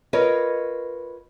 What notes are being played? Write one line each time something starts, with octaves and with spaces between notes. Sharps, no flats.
F4 A#4 B4 C#5 D#5